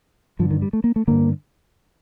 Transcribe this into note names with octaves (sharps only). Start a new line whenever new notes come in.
G2 D3 F3
D#3
G3
A3
A#3
A3
G2 D3 A#3